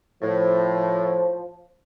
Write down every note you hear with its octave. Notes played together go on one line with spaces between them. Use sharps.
A2 F3